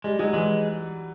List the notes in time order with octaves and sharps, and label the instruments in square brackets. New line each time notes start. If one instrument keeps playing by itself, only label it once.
[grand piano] G3 [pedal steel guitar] G#3
[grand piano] F#3 [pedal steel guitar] G#3
[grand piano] E3 [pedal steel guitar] G#3